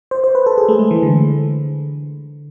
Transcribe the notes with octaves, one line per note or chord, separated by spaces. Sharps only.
C5
C5
B4
A4
G#4
A3
G#3
E3
D3